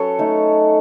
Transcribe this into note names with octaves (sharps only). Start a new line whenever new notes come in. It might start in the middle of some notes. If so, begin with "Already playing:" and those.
Already playing: F#3 C#4 A4 B4 C#5
A3 D#4